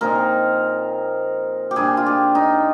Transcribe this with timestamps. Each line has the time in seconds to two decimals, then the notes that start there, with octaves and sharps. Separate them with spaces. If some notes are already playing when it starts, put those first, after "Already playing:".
0.01 A#2 F3 C4 D#4 A#4
1.71 G4
1.76 A#2 G3 D4 G#4
1.97 F4
2.06 G4
2.35 D#4